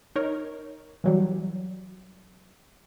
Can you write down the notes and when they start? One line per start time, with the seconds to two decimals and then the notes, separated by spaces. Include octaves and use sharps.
0.16 D#4 A#4 C#5
1.04 E3 F#3 G3